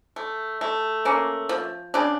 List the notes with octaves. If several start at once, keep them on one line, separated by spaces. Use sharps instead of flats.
A3
A3
A#3 C#4
F3
C#3 D4